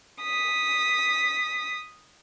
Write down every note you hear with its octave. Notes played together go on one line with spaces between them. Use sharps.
D#6 B6